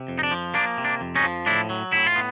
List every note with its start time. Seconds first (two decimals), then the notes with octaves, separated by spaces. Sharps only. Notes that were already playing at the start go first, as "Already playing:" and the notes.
Already playing: C3
0.08 F2
0.19 D#4
0.23 D4
0.31 F3
0.54 A#3 D4
0.78 C3
0.85 D4
1.01 F2
1.15 C#4 D#4
1.24 F3
1.46 A2 D4 E4
1.70 F#3
1.92 A2 E4
2.07 F4
2.16 B3